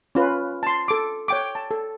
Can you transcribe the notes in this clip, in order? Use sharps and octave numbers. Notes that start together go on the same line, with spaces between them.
C#4 F4 B4
A5 C6
A4 D6
C#5 G5 D6
A5
A4